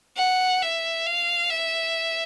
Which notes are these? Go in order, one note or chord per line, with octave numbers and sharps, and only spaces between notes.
F#5
E5
F5
E5